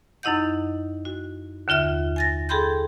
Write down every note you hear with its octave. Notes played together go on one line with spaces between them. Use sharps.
F#2 D#4 E4 D#5 F#5 G6
F#4
D#2 D3 F4 E5 F6
G#5 A6 A#6
G#4 A4 G5 B5 C6 G6